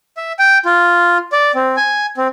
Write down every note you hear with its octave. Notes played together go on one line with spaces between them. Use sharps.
E5
G5
F4
D5
C4
G#5
C4